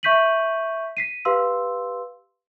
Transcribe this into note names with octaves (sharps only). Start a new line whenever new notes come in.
E5 C#6 G6 B6 D#7 F#7
B6 C7 D#7
G4 B4 F5 C6 E6